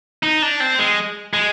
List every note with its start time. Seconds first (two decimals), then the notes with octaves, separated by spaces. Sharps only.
0.23 D#4
0.42 D4
0.60 C4
0.79 G#3
1.33 G#3